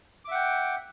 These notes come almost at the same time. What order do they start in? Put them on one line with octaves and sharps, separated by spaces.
D6 E5 F#5 G5